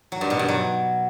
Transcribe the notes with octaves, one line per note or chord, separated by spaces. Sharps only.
F#3
G2
B2
G2
F#3